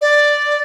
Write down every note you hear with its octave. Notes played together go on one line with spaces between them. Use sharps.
D5